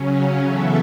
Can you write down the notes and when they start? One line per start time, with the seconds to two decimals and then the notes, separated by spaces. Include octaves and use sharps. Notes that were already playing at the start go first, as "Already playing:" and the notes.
Already playing: C#3 F#3 C#4
0.46 C#3 E3 B3 A4 E5